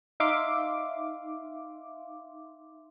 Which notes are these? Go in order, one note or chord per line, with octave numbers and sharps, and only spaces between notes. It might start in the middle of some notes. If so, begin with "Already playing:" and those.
D#4 E5 F5 C6 D6